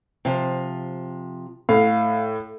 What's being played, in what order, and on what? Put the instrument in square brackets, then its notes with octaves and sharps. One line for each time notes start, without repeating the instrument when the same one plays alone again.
[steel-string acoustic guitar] C3 F3
[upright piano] A2 [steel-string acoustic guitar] F5